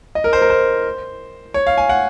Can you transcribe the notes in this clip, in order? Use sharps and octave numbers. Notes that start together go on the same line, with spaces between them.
D#5
A#4
C5
A#4
C5
C#5
F5
G#5
F#5